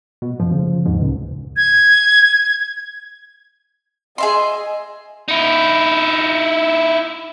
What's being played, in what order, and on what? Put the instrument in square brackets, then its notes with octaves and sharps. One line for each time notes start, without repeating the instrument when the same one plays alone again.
[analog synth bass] B2
[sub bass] F#2 [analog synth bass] F3
[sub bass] C#3
[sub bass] D#2 [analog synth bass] G#2
[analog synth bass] C#2 [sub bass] G#2
[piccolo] G#6
[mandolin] G#4 E5 C6 [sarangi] D#5
[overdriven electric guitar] D#4 E4